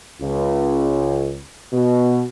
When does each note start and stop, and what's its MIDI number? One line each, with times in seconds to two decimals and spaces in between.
0.22 1.40 37
1.73 2.22 47